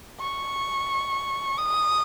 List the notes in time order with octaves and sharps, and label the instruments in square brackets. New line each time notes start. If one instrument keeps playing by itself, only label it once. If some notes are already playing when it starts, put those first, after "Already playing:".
[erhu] C#6
D#6